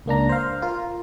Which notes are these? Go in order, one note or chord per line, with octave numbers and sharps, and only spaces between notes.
C#2 A#3 D4 A#5
C5 F5
F4 A#4